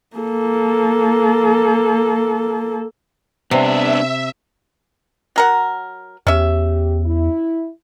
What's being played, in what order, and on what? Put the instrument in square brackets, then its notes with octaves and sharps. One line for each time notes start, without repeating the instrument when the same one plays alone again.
[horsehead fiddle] A#3 A4
[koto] C3 [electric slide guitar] B3 D4 [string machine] E5
[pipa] F#3 A#4 F#5
[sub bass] E2 [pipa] C#4 E5 [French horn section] G4
[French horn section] E4